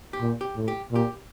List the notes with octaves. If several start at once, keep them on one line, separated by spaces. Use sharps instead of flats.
G4
A#2
G4
A2
G4
A#2 G4